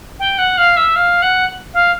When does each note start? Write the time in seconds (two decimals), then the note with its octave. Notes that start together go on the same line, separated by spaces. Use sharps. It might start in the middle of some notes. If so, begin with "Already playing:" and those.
0.19 G5
0.38 F#5
0.57 F5
0.76 E5
0.95 F5
1.22 F#5
1.73 F5